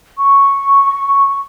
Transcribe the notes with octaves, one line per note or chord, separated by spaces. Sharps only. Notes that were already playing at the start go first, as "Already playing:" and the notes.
C#6